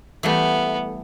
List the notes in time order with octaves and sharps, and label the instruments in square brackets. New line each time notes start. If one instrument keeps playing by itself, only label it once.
[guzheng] E3 G3 A3 [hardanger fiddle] B3